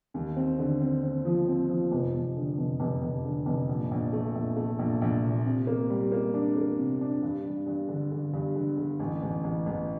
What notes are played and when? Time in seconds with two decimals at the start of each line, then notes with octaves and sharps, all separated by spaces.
0.14 D#2
0.36 C4
0.59 D3
0.81 C4
1.03 C4
1.25 F3
1.48 C4
1.69 F3
1.92 F1
2.14 F1
2.36 D3
2.58 F1
2.80 F1
3.02 F1
3.25 D3
3.46 F1
3.69 A#1
3.91 A#1
4.13 A3
4.35 A#1
4.57 A3
4.79 A#1
5.01 A#1
5.24 A#2
5.45 C3
5.67 A#3
5.90 G3
6.12 A#3
6.34 D4
6.56 A#3
6.78 C3
7.01 D4
7.22 G2
7.45 G2
7.66 G2
7.88 D3
8.11 D3
8.33 G2
8.55 D3
8.77 D3
8.99 A1
9.22 A1
9.44 A1
9.66 A1